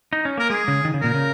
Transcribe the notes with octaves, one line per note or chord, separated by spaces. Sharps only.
D#4
C#4
A#3 A#4
G#3 G#4
C#3
D#3
C#3
A#2 A#4
C#3